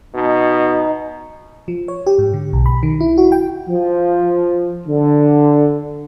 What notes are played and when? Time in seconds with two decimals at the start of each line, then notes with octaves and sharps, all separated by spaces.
0.14 B2 D#4
1.68 F3
1.88 C#5
2.07 G4
2.19 G#2
2.33 D3
2.53 B1
2.66 B5
2.83 D#3
3.00 E4
3.18 F#4
3.32 G5
3.69 F3
4.86 D3